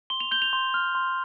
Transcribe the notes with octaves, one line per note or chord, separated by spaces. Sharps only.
C6 G7
F7
G6 G7
F7
C6
F6
C6